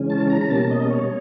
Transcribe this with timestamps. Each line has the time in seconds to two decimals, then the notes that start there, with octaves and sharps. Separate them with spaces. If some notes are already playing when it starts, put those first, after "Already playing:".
Already playing: C#3 E3 G#3 C#4
0.10 A5
0.30 A#5
0.41 A#5
0.50 B2 G3 A#3 C#4 A5
0.71 D#5
0.90 C#5